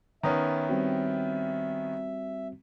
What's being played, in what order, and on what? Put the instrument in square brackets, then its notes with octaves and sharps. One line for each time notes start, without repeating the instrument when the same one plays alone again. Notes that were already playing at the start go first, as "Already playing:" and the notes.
[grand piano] D#3 B3 C#4 [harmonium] E5 [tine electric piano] A#5 D#6
[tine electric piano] G3 C4 F#4